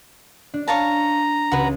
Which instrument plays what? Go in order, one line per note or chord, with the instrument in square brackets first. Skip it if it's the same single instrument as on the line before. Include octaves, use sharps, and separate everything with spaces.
[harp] D4
[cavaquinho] C#5 F5 A5 [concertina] A#5
[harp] C#2 [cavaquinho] F#4 B4